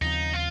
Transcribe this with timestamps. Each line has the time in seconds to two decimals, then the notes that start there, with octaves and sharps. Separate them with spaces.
0.01 D#2 C#3 F3 C4 D#4
0.33 F4